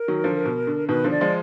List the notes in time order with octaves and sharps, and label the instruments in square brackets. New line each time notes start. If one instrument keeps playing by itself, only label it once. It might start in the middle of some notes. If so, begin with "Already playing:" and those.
Already playing: [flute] A#4
[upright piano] D#3 F#3
D3 F3
B2
D3
[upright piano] B2 D#3 [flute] B4
[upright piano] D3 F3
[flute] D5
[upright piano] F3 G#3